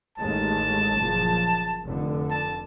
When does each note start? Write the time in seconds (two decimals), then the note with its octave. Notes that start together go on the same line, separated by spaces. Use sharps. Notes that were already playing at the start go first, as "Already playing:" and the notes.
0.18 A1 D#2 G#3 A5
0.96 F#1 A#2 F3
1.85 F1 D3
2.30 A5